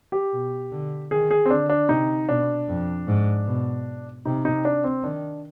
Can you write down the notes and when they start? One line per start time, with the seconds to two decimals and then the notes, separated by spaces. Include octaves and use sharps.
0.12 G4
0.33 B2
0.71 D3
1.11 D#3 G#4
1.31 G#4
1.46 C4
1.50 D3 D4
1.69 D4
1.89 C3 D#4
2.29 B2 D4
2.68 F2
3.08 G#2
3.47 B2
4.25 C3 D#4
4.45 D#4
4.65 D4
4.84 C4
5.03 D#3 D4